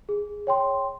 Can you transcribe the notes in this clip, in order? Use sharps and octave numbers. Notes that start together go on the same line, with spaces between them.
G#4
C#5 G5 C6